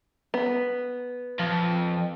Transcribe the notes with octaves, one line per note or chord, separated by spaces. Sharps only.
B3
F2